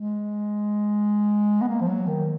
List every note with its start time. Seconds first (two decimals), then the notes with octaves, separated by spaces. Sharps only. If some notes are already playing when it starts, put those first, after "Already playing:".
Already playing: G#3
1.62 B3
1.68 A#3
1.81 F3
1.88 F#3
2.07 D#3